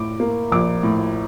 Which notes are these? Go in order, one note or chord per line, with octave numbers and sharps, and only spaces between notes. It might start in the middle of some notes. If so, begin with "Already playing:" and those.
Already playing: A2 D6
A#3
A#1 D6
A2